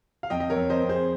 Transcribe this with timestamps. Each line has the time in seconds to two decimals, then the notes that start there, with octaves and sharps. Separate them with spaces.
0.23 F5
0.30 F2 D#5 G5
0.40 D#5
0.50 A#4 C#5
0.56 F2
0.70 C5 D#5
0.83 F2
0.89 G#4 C5